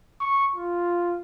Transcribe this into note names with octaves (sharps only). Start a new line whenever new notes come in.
C#6
F4